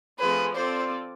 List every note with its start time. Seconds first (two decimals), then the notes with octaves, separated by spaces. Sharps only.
0.19 F3 A3 C4 F4 G#4 B4
0.55 C4 F4 A4 C5 D5